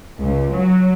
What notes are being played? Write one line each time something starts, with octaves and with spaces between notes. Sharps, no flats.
C#2
F#3